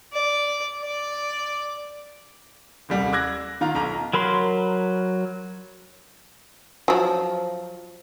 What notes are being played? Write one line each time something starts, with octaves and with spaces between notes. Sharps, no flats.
D5
D5
D#1 C2 G3
D6 E6 F#6 G#6 A#6
D#3 F4 A#5
B1 A#5
F#3 A#4 B5 C6
F3 F#3